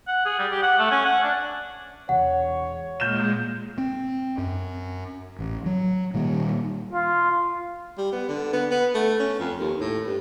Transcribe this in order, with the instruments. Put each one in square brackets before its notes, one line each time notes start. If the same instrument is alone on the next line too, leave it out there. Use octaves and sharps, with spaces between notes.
[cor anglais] F#5
G#4
G3
G4
F#5
A3
C#4
F#5
D4
[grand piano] E1 [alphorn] C#5 [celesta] F#5
[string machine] A#2 G#3 [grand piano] F6 G6 E7
[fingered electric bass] C4
F#2
A1
F#3
A#2 D#3 G3 A#3
[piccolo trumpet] F4
[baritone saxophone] G3
B3
D3
B3
B3
A3
C#4
F2
D#2
A2
G2